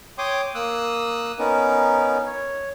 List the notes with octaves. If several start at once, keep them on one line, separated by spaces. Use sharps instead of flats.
C#5 G5 C6 D6 D#6
A#3 D#6 E6 F#6
B3 C#4 D#4 A#4
C#5